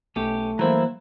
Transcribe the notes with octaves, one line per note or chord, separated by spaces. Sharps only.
B1 A3 C#4 G4
E3 F#3 G3 A#3 E4 C5 A#5